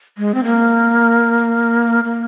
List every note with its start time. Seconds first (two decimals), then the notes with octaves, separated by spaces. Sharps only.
0.18 G#3
0.34 C4
0.44 A#3
2.04 A#3